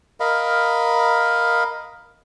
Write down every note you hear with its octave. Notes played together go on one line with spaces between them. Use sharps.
A#4 D#5 F5 B5